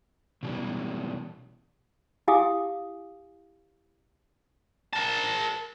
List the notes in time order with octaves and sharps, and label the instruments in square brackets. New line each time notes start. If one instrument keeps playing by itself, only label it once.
[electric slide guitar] B2 E3 G3 C#4
[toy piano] E4 G4 F5 G#5 D6 D#6
[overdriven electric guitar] A#4 A5